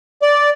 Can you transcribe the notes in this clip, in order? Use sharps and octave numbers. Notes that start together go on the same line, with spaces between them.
D5